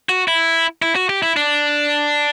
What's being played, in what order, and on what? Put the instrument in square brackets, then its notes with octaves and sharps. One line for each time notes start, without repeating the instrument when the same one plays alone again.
[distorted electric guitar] F#4
E4
E4
F#4
G4
E4
D4